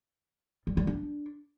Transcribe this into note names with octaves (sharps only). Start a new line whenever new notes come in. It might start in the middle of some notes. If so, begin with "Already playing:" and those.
G3
G3
D4